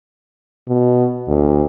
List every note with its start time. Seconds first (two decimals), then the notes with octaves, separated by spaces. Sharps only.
0.68 B2
1.27 D2